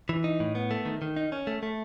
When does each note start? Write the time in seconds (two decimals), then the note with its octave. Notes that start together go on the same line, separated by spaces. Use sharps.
0.09 E3
0.24 D#4
0.40 A2
0.55 B3
0.71 A3
0.85 D#3
1.02 D#3
1.17 D#4
1.32 C#4
1.47 A3
1.63 A3